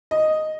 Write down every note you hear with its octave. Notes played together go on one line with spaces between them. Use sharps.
D#5